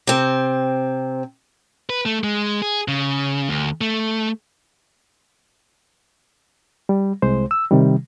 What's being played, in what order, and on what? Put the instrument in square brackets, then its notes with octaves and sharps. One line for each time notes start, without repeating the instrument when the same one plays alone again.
[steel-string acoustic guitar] C3 C4
[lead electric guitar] B4
A3
G#3
G#4
C#3
D2
A3
[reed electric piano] G3
C2 G#3 C5
E6
C3 D#3 G3